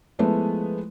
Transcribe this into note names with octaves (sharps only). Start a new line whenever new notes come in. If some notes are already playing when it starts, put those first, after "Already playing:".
F3 G#3 A3 B3 E4